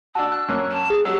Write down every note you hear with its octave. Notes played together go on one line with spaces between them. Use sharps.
D4 F#4 A5 E6
F#6
F#2 A#3 C#4
A5
G#4
F#3 G4 E6